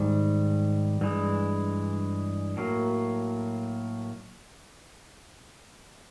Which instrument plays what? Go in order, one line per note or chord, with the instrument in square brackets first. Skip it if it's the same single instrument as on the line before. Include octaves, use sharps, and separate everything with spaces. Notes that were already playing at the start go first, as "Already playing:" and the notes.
Already playing: [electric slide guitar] G#2 D#3 G3
G2 E3 G#3
A2 F#3 A#3